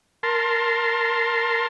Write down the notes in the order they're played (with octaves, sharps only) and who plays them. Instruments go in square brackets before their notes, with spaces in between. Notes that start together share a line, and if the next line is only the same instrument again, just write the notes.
[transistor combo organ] A#4 A5 C6